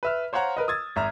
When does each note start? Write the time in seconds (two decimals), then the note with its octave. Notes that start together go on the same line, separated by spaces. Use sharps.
0.03 B4 E5 F6
0.33 C5 C#5 F5 F#5 A#5
0.57 A#4 B4 D#5
0.68 D#6 E6 G#6 A6
0.96 G#1 E5 A#5 F6